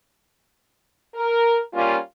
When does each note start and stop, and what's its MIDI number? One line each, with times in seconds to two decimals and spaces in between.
1.15 1.58 70
1.73 1.96 55
1.73 1.96 58
1.73 1.96 61
1.73 1.96 65